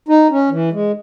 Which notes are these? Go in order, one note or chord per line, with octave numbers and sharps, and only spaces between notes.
D#4
C#4
E3
G#3